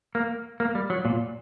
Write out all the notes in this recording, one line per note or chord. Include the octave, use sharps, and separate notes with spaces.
A#3
A#3
G3
F#3
A#2